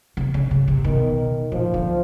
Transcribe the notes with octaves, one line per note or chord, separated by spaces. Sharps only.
C3
C#3
C#3
C3
B2 D#3
A#2 F3
D3